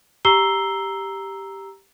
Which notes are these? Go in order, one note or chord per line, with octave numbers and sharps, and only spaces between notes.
G4 A#5 E6 C7 G7